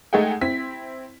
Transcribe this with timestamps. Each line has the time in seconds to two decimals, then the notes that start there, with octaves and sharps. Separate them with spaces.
0.13 G#3 A3 D#4 G#4 F#5 G5
0.41 C4 E4 B6